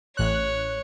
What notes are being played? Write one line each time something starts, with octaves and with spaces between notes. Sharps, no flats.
A1 C#5 F#6